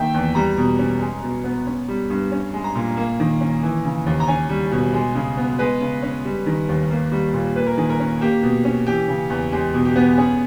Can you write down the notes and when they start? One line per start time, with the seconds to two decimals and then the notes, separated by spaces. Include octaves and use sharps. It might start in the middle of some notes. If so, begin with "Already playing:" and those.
Already playing: D#3 A#3 E5 G5
0.14 E2
0.35 G3 A#5
0.57 B2
0.79 C#4
1.00 G#3
1.22 B2
1.44 B3
1.66 C#4
1.88 G3
2.10 G2
2.32 C#4
2.54 G#3
2.64 A#5
2.75 A#2
2.97 A#3
3.20 D#3
3.41 C#4
3.63 E3
3.85 C#3
4.06 D#2
4.20 A#5
4.28 C#4 G#5
4.49 G3
4.71 B2
4.94 G#3
5.15 C#3
5.37 B3
5.59 G#3 B4
5.81 C#3
6.02 C#4
6.25 G3
6.46 D#3
6.69 D#2
6.90 A#3
7.12 G3
7.33 A#2
7.56 A#3 B4
7.67 A#4
7.77 D#3 G#4
7.90 A#4
8.00 C#4
8.21 A#3 G4
8.43 B2
8.65 C#4
8.86 E3 G4
9.08 C#3
9.30 E2
9.52 G#3 G4
9.74 B2
9.85 G4
9.96 B3
10.18 C#4 G#4